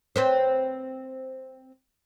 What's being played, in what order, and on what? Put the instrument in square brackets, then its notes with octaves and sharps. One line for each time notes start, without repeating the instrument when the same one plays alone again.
[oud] C4 B4 C5